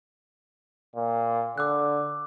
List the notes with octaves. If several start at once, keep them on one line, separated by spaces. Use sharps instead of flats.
A#2
D3 D6 E6 F#6